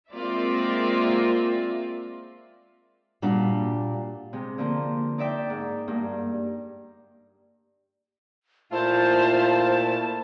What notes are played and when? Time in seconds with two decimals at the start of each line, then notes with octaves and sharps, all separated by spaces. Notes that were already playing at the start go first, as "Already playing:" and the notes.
0.12 G#3 A#3 C4 F4 D5 E5
3.22 A#2 G3 A#3 D4 F#4
4.33 C3 G#3
4.58 D3 F3 A#3
5.18 D#4 D5 E5 G5
5.50 G#2
5.88 G2 A#3
8.72 A#2 A3 E4 F4 C5 A5